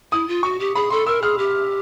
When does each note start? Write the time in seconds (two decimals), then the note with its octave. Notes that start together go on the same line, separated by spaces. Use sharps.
0.12 E4 D#6
0.28 F4
0.43 F#4 C#6
0.60 G4
0.75 G#4 B5
0.90 A4 C6
1.06 A#4 E6
1.22 G#4 F6
1.38 G4